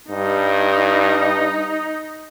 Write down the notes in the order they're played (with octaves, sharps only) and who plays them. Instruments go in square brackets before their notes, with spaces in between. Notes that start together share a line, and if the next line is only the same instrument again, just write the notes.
[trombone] G2 [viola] D#4